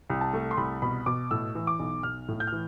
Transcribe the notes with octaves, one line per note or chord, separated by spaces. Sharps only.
C2
A5
A3
C6
C2 B5
B2 B5
B2 D6
A2 E6
E3
D6
B1
B1 F6
A2
G6
F6
E3